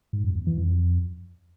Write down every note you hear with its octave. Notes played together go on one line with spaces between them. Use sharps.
G#2
F#2
E2
E3
F2